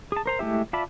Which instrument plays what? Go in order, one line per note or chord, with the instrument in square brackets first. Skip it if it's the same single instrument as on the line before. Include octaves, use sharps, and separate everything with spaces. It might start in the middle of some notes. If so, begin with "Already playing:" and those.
[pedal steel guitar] G#4 A5
A#4 C5 A#5
G#3 A3 E4 G4 E5
F4 D5 E5 A5 B5